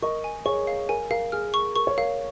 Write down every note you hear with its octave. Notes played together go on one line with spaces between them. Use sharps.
A#4 D#5 C#6
G#5
G#4 C#5 C#6
F5
A#4 G#5
A#4 F5
G#4 F6
C#6
A#4 C#6
C#5
A#4 F5